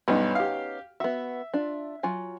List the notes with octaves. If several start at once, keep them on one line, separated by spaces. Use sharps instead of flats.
B1 G2 B3 C#4 D#4
G4 F5
B3 F#4 E5
D4 F4
F#3 F4 G#5